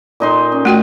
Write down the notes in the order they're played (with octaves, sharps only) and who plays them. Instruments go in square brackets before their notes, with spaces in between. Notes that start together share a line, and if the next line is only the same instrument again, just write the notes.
[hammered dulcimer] A#2 D#4 C6
C#4
[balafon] A3 F#4 G5